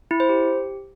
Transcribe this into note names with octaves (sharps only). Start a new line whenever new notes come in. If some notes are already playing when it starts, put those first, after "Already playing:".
E4
C5
G4